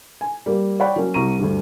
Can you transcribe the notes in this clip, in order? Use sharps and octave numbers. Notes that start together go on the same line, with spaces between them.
G#5
G3 A#3
C#5 D5 F#5 G5 B5
F#3 A#3 C#4
C2 G4 A#5 C#6 D#7
D2 G2